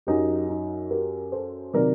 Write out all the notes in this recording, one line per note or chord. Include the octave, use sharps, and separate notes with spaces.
F#2 F#3 D#4 G4
D#4
G4 A#4
A4 C5
C3 D#3 F#3 A#4 D5